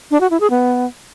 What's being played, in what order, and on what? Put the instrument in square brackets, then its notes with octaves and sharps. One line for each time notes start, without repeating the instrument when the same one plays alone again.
[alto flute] D4
F#4
E4
G#4
B3